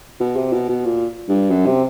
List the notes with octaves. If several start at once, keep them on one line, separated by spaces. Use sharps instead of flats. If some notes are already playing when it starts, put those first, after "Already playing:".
B2
C3
B2
B2
A#2
G2
F#2
C3